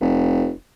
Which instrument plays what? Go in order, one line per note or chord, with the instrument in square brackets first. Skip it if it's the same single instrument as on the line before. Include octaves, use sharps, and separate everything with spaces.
[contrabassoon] F1